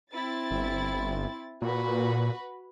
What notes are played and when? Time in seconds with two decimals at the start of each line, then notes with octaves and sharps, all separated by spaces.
0.13 C4 E4 A6
0.51 G1
1.62 A#2 F#4 B4 B5